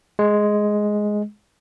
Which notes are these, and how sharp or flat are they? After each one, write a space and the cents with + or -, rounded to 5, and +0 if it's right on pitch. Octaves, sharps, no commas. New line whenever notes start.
G#3 +5